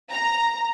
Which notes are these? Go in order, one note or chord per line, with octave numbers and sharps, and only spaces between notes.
A#5